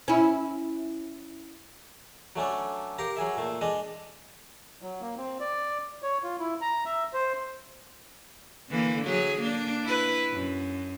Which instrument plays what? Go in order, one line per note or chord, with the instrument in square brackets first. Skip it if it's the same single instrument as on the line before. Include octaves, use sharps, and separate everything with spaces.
[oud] C#4 E4
[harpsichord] F#3 A3 C#4 D4
G4 A#4 F5 A#5
F#3 G#4 E5
A#2 A3
G#3 D4 D#5
[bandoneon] F#3
A#3
C4
D5
C#5
F4
E4
A#5
E5
C5
[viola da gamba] D3 E3 A#3
F#3 G#4
A#3 D4
E4 B4
F#2